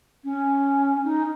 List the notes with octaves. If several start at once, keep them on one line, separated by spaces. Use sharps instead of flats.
C#4
D#4